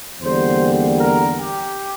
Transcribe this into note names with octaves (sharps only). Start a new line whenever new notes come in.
E2 D3 G3 A#3 C5
A#4
G4